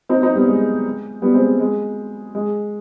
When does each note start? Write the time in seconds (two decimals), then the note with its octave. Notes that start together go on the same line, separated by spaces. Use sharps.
0.09 C4 D#4
0.22 C4 D#4
0.35 G3 B3
0.48 G#3
1.22 G3 B3
1.34 G#3 C4
1.59 G#3
2.35 G#3